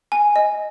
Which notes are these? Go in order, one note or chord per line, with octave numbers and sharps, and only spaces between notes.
G#5
D#5